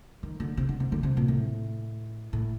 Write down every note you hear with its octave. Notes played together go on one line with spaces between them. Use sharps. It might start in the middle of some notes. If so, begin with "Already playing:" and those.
D#3
D3
C3
D3
C3
D3
C3
A#2
A2
A2